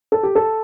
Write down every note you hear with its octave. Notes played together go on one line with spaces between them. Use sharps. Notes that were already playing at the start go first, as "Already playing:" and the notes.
A4
G4
A4